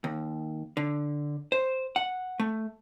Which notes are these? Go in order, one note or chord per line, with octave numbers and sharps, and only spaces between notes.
D#2
D3
C5
F#5
A3